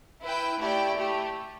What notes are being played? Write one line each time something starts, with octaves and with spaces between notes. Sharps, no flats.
E4 B4 G5
A3 E4 G4 D5 G5
A3 G4